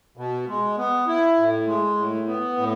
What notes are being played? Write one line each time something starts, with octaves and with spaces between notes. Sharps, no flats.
B2
G#3
B3
E4
A2
G#3
A2
B3
A2